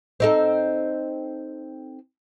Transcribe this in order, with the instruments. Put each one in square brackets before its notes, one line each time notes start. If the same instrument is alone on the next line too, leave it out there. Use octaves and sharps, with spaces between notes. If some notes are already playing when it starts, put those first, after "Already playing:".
[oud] C4 D#4 A4